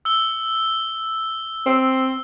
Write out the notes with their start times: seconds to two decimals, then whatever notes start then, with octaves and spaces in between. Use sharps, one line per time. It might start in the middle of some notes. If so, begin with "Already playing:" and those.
0.05 E6 G7
1.66 C4